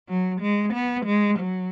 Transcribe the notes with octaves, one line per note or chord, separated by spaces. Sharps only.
F#3
G#3
B3
G#3
F#3